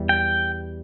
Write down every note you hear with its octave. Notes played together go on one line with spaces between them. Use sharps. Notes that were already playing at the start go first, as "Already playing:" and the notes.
Already playing: E2 E3 G3
G5